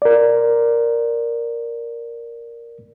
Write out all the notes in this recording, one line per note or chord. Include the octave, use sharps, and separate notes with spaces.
A#4 D5